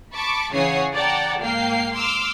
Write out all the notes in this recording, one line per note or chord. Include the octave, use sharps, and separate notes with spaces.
A5 B5 C#6 D6
C#3 E3 C#5 F#5 G#5 C7
D5 F#5 G5 A5 A#5
G#2 A#3 F5 G5 C7
C6 D6 E6 F6